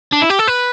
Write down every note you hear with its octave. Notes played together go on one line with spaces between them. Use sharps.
D4
E4
G4
A4
B4